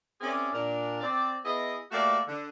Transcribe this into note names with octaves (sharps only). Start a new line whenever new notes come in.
C4 C#4 E4 G#4 A#4 D5
A#2 D4 A#4
C4 D5
B3 E4 G#4 D#5
A3 A#3 E4 F#4 G4 D5
D3